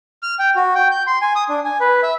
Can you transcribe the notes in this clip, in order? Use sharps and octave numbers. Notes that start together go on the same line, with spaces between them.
F6
G5
F#4
G5
G6
C6
G#5
D#6
D4
G#5
B4
E5